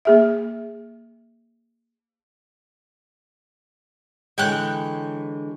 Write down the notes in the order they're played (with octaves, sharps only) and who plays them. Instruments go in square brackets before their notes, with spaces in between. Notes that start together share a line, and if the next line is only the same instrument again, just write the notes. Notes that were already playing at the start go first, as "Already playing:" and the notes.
[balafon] A#3 G#4 E5
[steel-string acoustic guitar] D3 E3 G#3 [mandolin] C#5 G5 F#6